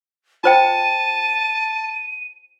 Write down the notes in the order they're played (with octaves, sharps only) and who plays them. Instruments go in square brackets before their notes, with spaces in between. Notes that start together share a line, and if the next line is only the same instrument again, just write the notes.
[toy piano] F4 C5 G5 [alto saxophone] A5 [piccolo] D#7